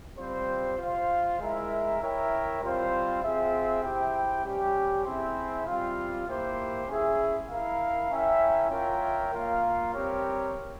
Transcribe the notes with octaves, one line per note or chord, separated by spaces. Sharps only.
G3 C4 F4 C5
F4 C5 F5
G#3 E4 A#4 E5
E4 A#4 C#5 E5 G5
G3 C4 F4 C5 F5
C4 F4 G#4 E5
E4 G4 C5 G5
G3 C#4 G4
C4 E4 G#4 C5 E5
G3 C4 F4
A#3 E4 G4 C5
C#4 E4 G#4 E5
E4 A#4 F5
C#4 E4 A#4 E5 G5
F4 A#4 C#5 E5 G5
A#3 F4 A#4 F5
G3 C4 G4 A#4 C#5